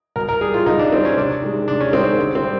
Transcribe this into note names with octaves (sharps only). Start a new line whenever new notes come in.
B2 A#4
A#4
G3 G#4
F4
B2 D#4
D4
G3 C4
C#4
C3 D4
D#3 G#3
C3 D4
C#4
D#3 G#3 C4
D3
C4
G3